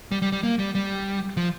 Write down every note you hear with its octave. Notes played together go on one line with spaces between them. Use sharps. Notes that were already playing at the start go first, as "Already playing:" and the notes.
G3
G3
G3
A#3
G3
G3
F3